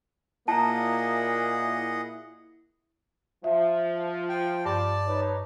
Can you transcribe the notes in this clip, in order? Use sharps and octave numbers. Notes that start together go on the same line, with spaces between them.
A#2 A#3 E4 G#4 D#5 F#5 A5 A#5
F3 E5
G5
G2 D5 A5
D#4 B4 C#5